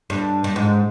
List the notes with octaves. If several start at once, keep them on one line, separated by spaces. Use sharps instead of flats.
G2
G2
G#2